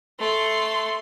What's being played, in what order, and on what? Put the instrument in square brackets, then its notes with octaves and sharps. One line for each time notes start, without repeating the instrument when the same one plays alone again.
[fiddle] A3 C6